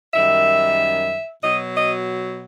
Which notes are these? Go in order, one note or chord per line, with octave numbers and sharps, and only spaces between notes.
F#2 D#3 G3 E5
B2 F#3 D#5
D#5